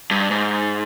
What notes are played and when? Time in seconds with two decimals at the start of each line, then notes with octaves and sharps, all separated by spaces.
0.11 G2
0.31 G#2